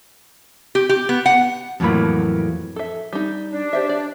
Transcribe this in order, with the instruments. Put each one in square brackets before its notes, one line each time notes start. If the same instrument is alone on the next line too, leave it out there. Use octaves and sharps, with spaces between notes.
[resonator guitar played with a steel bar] G4
G4
B3
F#5
[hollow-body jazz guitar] F2 A2 E3 F#3 A#3 B5
[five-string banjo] A4 E5
G3 D#4
[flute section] D4
[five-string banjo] G4 C5 E5
D5